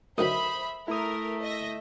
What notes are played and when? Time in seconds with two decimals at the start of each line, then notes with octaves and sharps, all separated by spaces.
0.18 D2 D#3 F#3 C5 E5 B5 D#6
0.88 A3 E4 A#4 D#6
1.42 D#5 E5 A#6